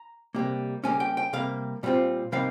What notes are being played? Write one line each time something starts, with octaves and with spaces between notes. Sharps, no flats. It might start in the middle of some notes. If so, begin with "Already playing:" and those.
Already playing: A#5
C3 G3 A#3
C#3 G3 A#3 C#4 G#5
G5
G5
C3 G3 A#3 F5
A#2 G3 C4 F4
C3 G3 A#3 D#4 F5